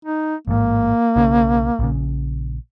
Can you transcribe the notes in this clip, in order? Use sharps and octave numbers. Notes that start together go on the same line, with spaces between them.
D#4
A1 G#2 A#3
B1 C#3 C#4
A#1 A#2 C#3